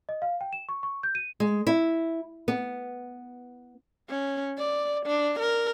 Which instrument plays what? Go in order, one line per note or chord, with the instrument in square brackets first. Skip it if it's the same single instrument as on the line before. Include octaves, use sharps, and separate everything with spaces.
[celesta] D#5
F5
G5
E7
C#6
C#6
G6
D#7
[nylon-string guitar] G#3
E4
B3
[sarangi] C#4
D5
D4
A#4